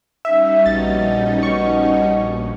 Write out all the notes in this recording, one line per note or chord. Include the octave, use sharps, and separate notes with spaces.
G3 C#4 D#4 E5
A#1 B2 A6
B2 C#6